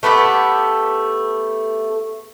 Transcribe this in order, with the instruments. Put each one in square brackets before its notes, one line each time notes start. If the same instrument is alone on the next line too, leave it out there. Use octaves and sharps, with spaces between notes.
[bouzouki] A3 B3 G4 A4